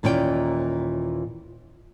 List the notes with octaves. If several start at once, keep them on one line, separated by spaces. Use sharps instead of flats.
D#2 A#2 E3 C#4 F4 G5